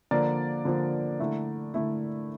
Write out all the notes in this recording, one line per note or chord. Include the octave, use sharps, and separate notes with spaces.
D3 F3 A#3 A#4 D5
D3 F3 A#3
D3 A3 E4
D3 A3 E4